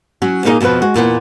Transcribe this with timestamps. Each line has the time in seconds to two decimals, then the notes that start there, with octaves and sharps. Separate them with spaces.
0.22 F#3 C#4 F#4
0.44 A#2 A#3 D#4 E4 G#4 D#5
0.60 F2 B2 F3 B3 B4
0.82 G#3 F#4
0.94 E2 A#2 A#3 B3